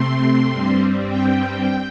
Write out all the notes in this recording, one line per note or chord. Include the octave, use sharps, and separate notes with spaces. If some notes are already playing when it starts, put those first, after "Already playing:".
Already playing: C3 A3 C4 C6
G2 G3 C4
G5